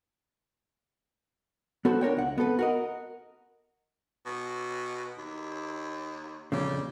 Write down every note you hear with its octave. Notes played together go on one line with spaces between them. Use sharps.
B3 F#4 A4 C5
D4 A#4 C#5 G5
C#2 F#5
B3 C4 A4 B4
F#4 A#4 D#5
B2
D#2
F2 A#2 C#3 G3